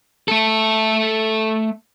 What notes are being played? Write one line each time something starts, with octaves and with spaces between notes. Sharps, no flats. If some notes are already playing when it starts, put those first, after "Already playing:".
A3 A4